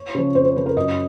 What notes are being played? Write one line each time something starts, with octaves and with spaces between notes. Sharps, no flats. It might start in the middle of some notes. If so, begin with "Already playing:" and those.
Already playing: C#5
C#3 F3
F2 C5
C5
C#3 F3 B4
A#4
F#2 D#5